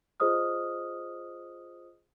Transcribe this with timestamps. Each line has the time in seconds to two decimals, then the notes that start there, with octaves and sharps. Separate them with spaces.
0.20 F4 G#4 C5 D#5 D#6 F6